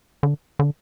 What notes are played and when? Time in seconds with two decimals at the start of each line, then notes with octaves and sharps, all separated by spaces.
0.23 D3
0.59 D3